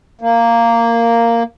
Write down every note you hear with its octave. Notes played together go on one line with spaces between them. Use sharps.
A#3